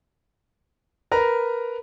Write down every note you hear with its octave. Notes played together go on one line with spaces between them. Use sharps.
A#4 B4 A#5